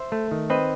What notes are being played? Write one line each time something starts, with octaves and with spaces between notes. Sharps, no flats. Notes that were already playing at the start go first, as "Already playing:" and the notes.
Already playing: C5 E5
A3
D#3
C4 B4 D#5